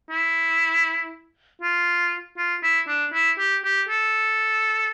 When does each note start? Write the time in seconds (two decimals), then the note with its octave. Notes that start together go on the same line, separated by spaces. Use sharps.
0.10 E4
1.62 F4
2.38 F4
2.63 E4
2.88 D4
3.13 E4
3.39 G4
3.64 G4
3.89 A4